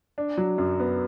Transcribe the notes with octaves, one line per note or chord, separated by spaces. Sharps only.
D4
F#3
F#2
B3